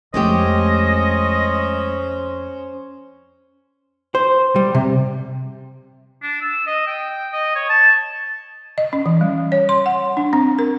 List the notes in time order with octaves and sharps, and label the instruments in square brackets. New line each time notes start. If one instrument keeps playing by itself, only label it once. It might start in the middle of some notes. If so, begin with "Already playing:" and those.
[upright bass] F2 [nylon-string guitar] G#3 A3 G4 [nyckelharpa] C#4 C5 [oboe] D#5
[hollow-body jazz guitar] C5
G3
C3
[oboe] D4
E6
D#5
G5
D#5
C#5
A5
[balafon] D#5
C#4
E3
G3
C#5
C6
F#5
D4
C4
A#4